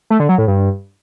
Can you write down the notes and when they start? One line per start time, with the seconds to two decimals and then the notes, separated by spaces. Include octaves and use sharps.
0.10 A3
0.20 D3
0.29 F#3
0.38 A2
0.48 G2